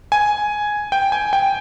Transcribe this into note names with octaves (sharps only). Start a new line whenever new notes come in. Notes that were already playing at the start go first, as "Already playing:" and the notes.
G#5
G5
G#5
G5